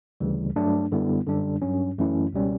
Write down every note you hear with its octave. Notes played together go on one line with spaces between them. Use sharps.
D2 C#3 E3 G3
G2 F#3 A3 D4
F#2 D3 G3 B3 E4
F#2 D3 G3 D4
G2 F#3 C#4
F#2 E3 A3 C#4 E4
C#2 B2 G3 C#4